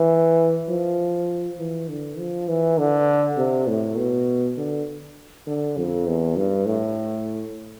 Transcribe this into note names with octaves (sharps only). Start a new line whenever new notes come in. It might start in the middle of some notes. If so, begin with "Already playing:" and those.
Already playing: E3
F3
E3
D3
F3
E3
D3
C3
A2
B2
D3
D3
F2
E2
G2
A2